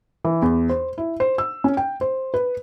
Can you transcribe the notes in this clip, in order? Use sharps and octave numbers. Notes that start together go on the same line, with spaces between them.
E3
E2
C5
E4
C5
E6
C#4
G5
C5
B4